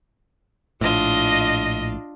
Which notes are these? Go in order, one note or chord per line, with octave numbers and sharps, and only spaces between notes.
A#1 A2 D4 F4 D#5